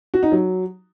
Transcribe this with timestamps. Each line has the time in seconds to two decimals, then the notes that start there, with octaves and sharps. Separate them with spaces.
0.14 F#4
0.23 D#4
0.32 F#3